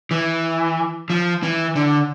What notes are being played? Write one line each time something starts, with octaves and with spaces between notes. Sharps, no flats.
E3
F3
E3
D3